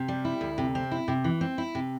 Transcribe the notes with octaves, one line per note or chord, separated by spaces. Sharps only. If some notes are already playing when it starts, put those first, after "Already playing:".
Already playing: C3
G3
E4
D2
C3
C4
E4
C3
E3
C4
E4
C3